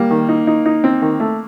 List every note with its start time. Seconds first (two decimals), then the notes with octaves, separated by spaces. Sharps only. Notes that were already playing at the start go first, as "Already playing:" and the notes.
Already playing: G3 A#3
0.11 D#3
0.29 D#4
0.47 D#4
0.66 D#4
0.84 C4
1.02 D#3
1.20 A3